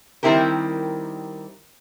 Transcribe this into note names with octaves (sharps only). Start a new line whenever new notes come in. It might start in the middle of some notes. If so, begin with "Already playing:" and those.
D#3 G3 C4 E4 G4 A#4